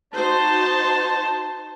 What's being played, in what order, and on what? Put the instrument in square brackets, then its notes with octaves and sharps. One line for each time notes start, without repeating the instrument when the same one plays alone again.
[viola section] D#4 F#4 C5 [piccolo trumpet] A5